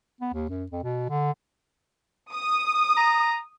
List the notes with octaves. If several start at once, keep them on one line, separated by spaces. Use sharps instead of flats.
B3
D#2
F#2
F2
B2
D3
D#6
A#5